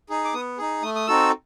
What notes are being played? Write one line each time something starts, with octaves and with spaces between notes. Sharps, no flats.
D#4 G#4
D6
B3 D#6
D#4 G#4
A3 D#6
D#6
C4 D#4 F#4 A4 E6